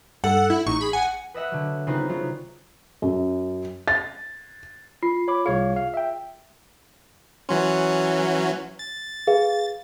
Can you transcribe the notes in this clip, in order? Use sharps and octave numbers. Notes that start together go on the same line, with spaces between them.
G2 A4 F#5
E4
A1 D#4 C#6
G#4 B5
F#5 G#5
B4 D#5 E5 F#5
D3 F#3
C#3 B3 C4 D#4 F4 B4
F#3 B3 D#4 F4
F#2
A6
F4 C7
C#5 B5 D6
C2 G#4 C#5 F5
F5
E5 G5
E3 F#3 C#4 C6
A6
G#4 B4 F5